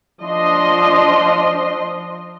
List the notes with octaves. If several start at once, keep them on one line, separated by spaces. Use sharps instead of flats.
F3 D4 D#5 C6